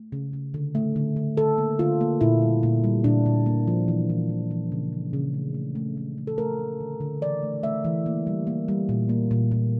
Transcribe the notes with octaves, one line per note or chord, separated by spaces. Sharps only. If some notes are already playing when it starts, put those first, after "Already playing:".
Already playing: A3
C#3
C#3
D3
A3
D3
D3
D3 A4
A#3
D3 F4
A#3
A#2 E4
G3
A#2
G3
A#2 D4
A#2
A#3
F3
E3
E3
E3
E3
C#3
F3
C#3
A3
A3
A3
A3
A3
A4
A3 A#4
A3
D3
D3
E3 D5
A3
A3 E5
E3
A#3
G3
A#3
G3
A#2
A#3
A#2
A#2